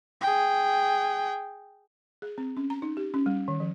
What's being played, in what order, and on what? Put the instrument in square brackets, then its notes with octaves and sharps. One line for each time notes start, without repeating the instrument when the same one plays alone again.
[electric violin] G#4 G5
[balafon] G#4
C4
C#4
A#5
D#4
G4
C#4
G3
D#3
F3